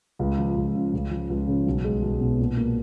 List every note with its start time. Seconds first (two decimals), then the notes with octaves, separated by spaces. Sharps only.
0.19 C#2
0.38 F3
0.56 C#2
0.75 C#3
0.93 C#2
1.11 F3
1.30 C#2
1.47 C#3
1.67 B1
1.84 G#3
2.02 B1
2.20 B2
2.39 A#2
2.57 A#3